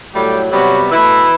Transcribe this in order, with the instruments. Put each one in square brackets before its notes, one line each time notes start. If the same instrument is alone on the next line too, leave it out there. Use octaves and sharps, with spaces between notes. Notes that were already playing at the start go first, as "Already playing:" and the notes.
[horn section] A2 F#3 G3 A3 G4
C3 F#3 G3 B3 F#4
B2 E3 A3 E4